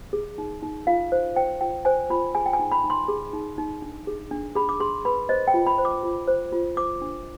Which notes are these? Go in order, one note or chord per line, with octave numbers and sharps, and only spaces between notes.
G#4
D#4
D#4
F4 F5
C5
C5 G5
F4 G5
C5 G#5
F4 B5
G#4 G#5
G5
G#5
D#4
B5
D#4
C6
G#4
D#4
D#4
D4
G#4
D4
G#4 B5
D6
G#4 C6
B4 B5
C5 D#5
G5
F4
B5
C5
D6
F4
C5
F4
C5 D6
D4